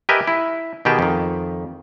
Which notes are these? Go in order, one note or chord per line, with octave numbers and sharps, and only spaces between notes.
G4 A#4 B4 D#5 E5 G#5
E4
B2 D#3 G4 G#4 G5 A5
F2 D#3